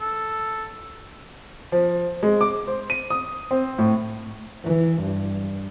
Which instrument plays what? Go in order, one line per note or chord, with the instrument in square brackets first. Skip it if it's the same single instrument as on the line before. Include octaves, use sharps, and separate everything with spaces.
[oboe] A4
[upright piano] F3
G#3
D6
C5
D#7
D#6
C4
A2
[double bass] E3
G2